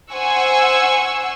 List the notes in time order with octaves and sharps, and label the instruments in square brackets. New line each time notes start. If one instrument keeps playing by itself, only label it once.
[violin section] C5 F#5 G#5 C#6 E6